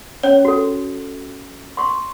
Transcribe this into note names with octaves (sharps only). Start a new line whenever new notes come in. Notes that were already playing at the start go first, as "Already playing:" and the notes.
C#4 C#5
F#4 A4
C6 C#6